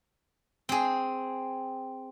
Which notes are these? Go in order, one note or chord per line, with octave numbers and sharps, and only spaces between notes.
C4 G#4